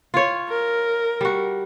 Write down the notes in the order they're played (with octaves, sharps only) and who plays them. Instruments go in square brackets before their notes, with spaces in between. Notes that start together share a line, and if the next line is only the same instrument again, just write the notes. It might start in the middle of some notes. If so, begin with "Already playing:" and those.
[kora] F4 C#5
[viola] A#4
[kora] G3 F#4